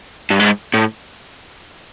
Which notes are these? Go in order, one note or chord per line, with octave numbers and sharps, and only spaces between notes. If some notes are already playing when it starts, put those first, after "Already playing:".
G2
G#2
A2